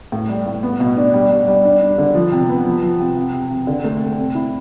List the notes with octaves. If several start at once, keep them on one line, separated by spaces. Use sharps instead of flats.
A2
G3
A2
B3
B2
D4
G3
G3
G3
D4
D4
D3
F3
C3
B3
F3
F3
C3
C3
C3
C3
D3
A3
C4
C3
E4